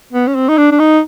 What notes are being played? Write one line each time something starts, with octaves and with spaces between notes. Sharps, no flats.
B3
C#4
C4
D#4
D4
D4
D#4